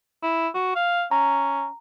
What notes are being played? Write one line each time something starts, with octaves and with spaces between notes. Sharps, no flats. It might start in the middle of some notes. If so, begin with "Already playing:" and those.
E4
F#4
F5
C#4 A#5